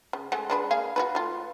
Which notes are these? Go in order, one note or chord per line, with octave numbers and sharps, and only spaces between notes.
C#3
G#3 A3 F#5
G#3 D4 B4
A#3 G#4 F5
F#4 G#4 B4
A3 F4